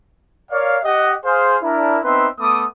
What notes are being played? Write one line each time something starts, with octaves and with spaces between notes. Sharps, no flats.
A#4 C#5 D5 F5
G4 D#5 F#5
G#4 C5 F5
D4 E4 A#4
B3 C4 D#4 B4 E5 C6
A3 B3 D6 D#6